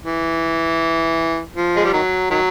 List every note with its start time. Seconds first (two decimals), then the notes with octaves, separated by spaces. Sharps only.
0.05 E3
1.56 F3
1.76 G#3
1.85 G3
1.93 D#3 F#3
2.30 D#3 F#3